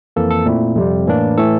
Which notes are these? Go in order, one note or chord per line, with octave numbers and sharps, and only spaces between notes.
F2 E3 A#3 A4
A4
A#2 A3 C4 E4
F2 C3 G3
A2 E3 A#3 D4
A2 E3 A3 A4